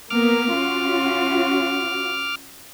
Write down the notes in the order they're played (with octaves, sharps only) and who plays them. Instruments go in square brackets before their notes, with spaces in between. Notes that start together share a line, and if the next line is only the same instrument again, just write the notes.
[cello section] A#3 B3 A#4 [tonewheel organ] D6 F6
[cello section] C#4 F4 F#4